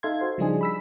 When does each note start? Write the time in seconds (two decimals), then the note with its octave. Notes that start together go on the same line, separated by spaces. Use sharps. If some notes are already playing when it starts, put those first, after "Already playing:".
0.03 D#4 A4 E5 F5 C6 G#6
0.21 F#4 C5
0.38 C#3 F3 G3 D4 D#4 G#4
0.61 B5 E6 B6